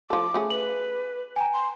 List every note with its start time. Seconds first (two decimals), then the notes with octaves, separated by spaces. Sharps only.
0.10 F3 A4 D6
0.34 A3 C#4 G#4
0.50 B4 F#7
1.36 G5 G#5 A#5
1.53 C6